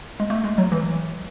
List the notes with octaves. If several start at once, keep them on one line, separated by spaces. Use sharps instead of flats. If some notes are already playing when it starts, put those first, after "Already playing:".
G#3
A3
G#3
F#3
E3